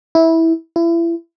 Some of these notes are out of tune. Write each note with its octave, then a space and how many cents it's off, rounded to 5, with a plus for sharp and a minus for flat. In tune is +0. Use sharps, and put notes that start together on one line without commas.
E4 -15
E4 +30